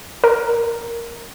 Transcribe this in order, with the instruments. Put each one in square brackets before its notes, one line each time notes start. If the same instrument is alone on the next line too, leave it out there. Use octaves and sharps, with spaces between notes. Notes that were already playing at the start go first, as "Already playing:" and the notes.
[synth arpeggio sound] A#4